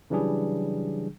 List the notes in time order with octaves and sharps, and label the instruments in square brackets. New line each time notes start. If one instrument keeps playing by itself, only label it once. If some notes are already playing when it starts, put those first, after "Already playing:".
[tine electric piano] C#3 E3 F#3 G3 D4 G#4